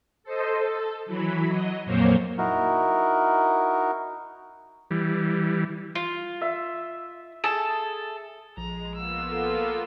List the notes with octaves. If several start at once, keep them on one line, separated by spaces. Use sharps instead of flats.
A4 C5 D#5
A4
E3 F#3 B5
F#3 D#5
F2 A#2 F#3 A#3 C5 C#5
D#4 E4 F#4 A#4
E3 G3
F4
E5
G#4 A4 A5
A#1 F3 G#3 A#5
A#3 B3 F4 E6
A4